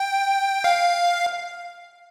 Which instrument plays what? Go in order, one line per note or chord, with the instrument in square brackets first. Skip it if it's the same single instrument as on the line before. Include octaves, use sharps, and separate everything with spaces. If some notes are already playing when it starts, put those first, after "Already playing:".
Already playing: [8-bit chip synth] G5
F5